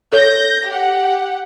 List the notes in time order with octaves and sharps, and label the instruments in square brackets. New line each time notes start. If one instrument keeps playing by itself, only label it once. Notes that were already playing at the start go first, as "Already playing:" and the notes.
[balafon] A4 C#5 [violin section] G6 A#6
[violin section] G4 F#5